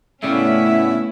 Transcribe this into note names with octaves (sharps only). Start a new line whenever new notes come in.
A2 C#3 G3 A3 B3 C#4 E4 E5